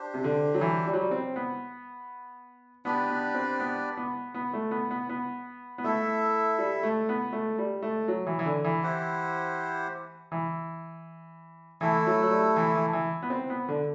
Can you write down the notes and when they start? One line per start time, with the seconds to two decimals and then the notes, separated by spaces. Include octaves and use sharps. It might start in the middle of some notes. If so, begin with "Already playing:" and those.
Already playing: D4 G4 C5
0.14 C3
0.24 D3
0.54 F#3
0.61 E3
0.86 G3
0.93 F#3
1.01 G3
1.11 C4
1.36 B3
2.85 B3 D4 G4 B4 D5
3.10 B3
3.35 C4
3.60 B3
3.97 B3
4.34 B3
4.54 A3
4.71 B3
4.91 B3
5.09 B3
5.78 B3
5.84 A3 E4 A4 E5
6.58 G3
6.83 A3
7.09 B3
7.33 A3
7.58 G3
7.83 A3
8.08 F#3
8.27 E3
8.39 E3
8.46 D3
8.64 E3
8.83 E4 G4 C5 F#5
10.32 E3
11.81 E3 A3 E4 A4
12.07 F#3
12.23 F#3
12.31 G3
12.56 E3
12.75 E3
12.93 E3
13.23 B3
13.30 C4
13.50 B3
13.68 D3